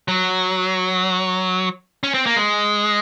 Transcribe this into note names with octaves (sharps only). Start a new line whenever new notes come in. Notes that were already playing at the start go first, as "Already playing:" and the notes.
F#3
C#4
C4
A#3
G#3